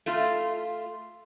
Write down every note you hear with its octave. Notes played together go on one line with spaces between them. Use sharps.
A3 F4